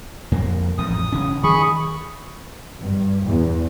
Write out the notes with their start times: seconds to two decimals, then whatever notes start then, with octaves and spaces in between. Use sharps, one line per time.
0.32 F2 A#3
0.78 A1 F2 G#2 D#6
1.12 E1 C#3 C#4
1.43 D#3 G#4 B5 C#6
2.79 G2
3.27 E2